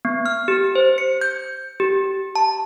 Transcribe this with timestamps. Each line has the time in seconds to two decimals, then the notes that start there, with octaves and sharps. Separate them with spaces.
0.05 B3
0.26 F6
0.48 G4
0.75 C5
0.98 C#7
1.21 G6
1.80 G4
2.36 A5